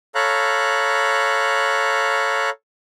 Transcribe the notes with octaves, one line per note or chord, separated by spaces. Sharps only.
A4 C#5 F5 A#5 B5 F#6